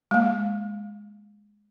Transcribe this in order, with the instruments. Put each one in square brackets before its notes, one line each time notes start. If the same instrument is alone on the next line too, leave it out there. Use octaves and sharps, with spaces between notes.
[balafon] G#3 A#3